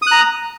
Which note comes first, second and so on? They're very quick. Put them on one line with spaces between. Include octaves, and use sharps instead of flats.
D#6 F#6 A#5